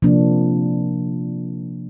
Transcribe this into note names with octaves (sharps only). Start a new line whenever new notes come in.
C3 F3 A#3 D4